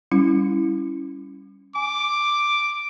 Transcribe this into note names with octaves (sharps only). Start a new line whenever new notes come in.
G3 C#4 E4
G#5 D6